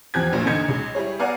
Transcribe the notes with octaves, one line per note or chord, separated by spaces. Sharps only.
E2 F3 G4 F#6 G#6
A#1 G2 A#2
E2 A#2 D3 D#4 G#6 C#7
C#2 G#3
G3 E4 G#4 C#5
B3 D5 F5 F#5 G#5 A#5